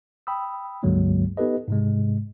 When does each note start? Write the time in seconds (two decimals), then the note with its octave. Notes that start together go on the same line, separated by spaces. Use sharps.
0.27 G5 B5 D#6 E6
0.83 C#2 G2 D3 F#3 G#3 A#3
1.37 B3 D#4 G4 A4 B4 D#5
1.68 G#2 C3 G#3